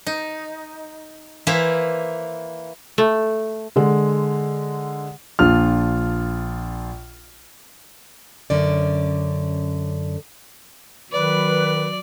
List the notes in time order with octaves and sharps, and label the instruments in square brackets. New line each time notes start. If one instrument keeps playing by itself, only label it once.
[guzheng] D#4
E3 A#3 E4 C5 B5
[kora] A3
[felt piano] D3 G#3
[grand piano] A#1 D4 F4 F6
[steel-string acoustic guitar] F#2 D3 C#4 D5
[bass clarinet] D#3 [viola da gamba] F#3 [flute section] B4 [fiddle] D5